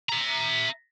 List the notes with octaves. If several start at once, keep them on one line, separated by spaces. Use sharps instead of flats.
E5 A#5